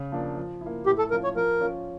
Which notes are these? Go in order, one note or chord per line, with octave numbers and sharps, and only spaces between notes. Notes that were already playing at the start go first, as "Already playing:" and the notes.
Already playing: C#3
F3 A#3 D4
F3
E4
A#3
A2 G4
A4
F3 C#4 F4 A#4
C#5
F3 A#4
C#4 F4